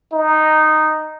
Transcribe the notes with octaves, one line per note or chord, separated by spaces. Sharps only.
D#4